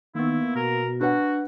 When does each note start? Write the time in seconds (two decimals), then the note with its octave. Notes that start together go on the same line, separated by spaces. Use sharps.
0.15 D#3 A#3 B3 E4
0.56 B2 A#4
1.01 D4 F#4 B4 F#5